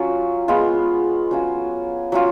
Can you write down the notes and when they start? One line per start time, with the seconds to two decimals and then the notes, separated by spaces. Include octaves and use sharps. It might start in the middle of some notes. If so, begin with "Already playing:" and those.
Already playing: F#3 C#4 F4
0.48 G#3 B3 F4
1.31 F#3 C#4 F4
2.12 F#3 C#4 F4